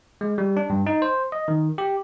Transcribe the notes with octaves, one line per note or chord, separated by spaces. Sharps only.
G#3
G3
D4
G2
D#4
C5
D#5
D#3
G4